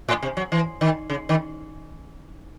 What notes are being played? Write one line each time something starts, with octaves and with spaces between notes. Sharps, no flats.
A2
C3
F#3
E3
D#3
C#3
D#3